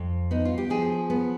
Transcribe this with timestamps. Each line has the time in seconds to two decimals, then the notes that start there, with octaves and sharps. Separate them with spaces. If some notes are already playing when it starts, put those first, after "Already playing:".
Already playing: F2
0.31 B3 D#4
0.45 F4
0.58 G4
0.70 F3 G#4
1.10 B3